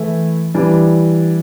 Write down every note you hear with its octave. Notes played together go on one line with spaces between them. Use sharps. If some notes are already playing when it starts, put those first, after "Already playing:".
Already playing: E3 A3 E4
E3 G3 D4